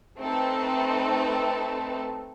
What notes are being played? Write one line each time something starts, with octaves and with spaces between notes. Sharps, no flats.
A3 C4 D#4 A4 B4